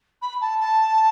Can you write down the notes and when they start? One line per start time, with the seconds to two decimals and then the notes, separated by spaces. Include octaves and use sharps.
0.22 B5
0.41 A5
0.60 A5